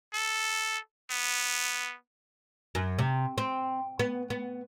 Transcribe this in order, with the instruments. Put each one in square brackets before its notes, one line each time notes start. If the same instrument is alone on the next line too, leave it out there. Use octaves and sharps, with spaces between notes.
[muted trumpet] A4
B3
[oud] F#2
C3
C4
B3
B3